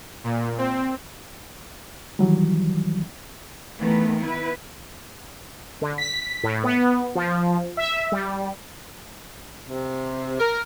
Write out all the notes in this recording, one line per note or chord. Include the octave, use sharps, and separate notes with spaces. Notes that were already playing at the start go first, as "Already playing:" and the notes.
A#2
C4
D#3 E3 F#3 G3
D#3 E3 A3 B3
B3 E4 B4
D3
B6
A2
B3
F3
E5
G3
C3
A#4